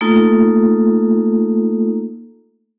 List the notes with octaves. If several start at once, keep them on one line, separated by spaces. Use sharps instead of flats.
A3 A#3 D#4 F4 A4